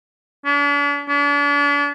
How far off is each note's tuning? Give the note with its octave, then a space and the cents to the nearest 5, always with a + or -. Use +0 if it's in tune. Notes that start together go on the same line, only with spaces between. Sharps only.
D4 -45
D4 -40